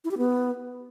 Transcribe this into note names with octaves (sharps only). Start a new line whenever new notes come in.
E4
G4
B3